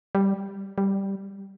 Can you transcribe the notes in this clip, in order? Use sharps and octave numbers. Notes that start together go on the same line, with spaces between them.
G3
G3